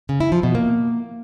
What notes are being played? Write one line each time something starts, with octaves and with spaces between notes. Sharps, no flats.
C#3
E4
F3
B2
A#3